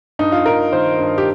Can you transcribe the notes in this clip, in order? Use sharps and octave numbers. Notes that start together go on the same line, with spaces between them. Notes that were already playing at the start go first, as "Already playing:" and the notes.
G2 D#4
F4
G2 A#4
D#3 C5
G2
G4